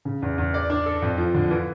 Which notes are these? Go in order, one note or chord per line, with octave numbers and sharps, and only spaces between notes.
C#3
E2
E2
D5
D4
A4
F2
F3
D3
E3